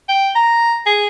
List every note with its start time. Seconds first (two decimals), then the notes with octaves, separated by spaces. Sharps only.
0.09 G5
0.36 A#5
0.86 G#4